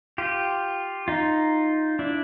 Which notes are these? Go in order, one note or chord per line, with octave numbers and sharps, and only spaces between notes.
F4 G4
D#4 F4
D4 E4